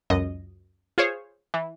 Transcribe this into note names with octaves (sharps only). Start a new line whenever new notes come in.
C#2 F#2 D#5
F4 G#4 C5 C#5
E3